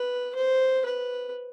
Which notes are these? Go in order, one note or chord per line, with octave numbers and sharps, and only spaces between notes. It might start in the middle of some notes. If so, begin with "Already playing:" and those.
Already playing: B4
C5
B4